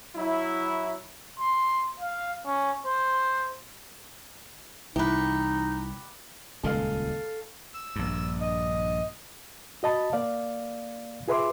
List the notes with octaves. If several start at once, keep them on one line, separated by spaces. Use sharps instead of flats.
F#3 E4
C6
F5
C#4
C5
C2 E3 D#4 G4 B4
D#1 C#2 G#3 A4 F5
E6
A#1 G2
D#5
F#4 D#5 A5 B5
A#3 D5 F5
F4 G#4 B4 E5 C6 D6